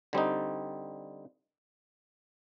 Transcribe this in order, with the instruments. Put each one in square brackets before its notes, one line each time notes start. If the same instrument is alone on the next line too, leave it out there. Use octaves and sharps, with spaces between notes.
[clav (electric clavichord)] D3 G3 C4 D#4